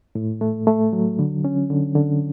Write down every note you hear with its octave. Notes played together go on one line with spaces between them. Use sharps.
A2
A3
A3
F#3
D3
C#4
D3
D3